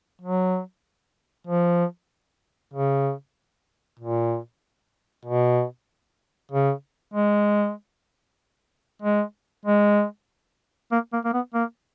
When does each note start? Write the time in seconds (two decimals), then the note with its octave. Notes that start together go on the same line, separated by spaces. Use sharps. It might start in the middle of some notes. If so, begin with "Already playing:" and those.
0.21 F#3
1.47 F3
2.73 C#3
3.99 A#2
5.25 B2
6.52 C#3
7.14 G#3
9.02 G#3
9.66 G#3
10.92 A#3
11.13 A#3
11.24 A#3
11.34 B3
11.54 A#3